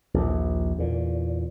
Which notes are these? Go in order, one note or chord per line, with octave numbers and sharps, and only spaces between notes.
A#1 D#2
E2 A#2